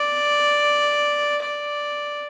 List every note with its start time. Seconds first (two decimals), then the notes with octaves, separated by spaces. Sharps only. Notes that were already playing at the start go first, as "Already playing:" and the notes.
Already playing: D5
1.42 D5